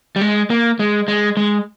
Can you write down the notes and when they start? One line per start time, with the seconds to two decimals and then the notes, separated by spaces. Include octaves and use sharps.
0.16 G3
0.21 G#3
0.50 A#3
0.79 G#3
1.08 G#3
1.37 G#3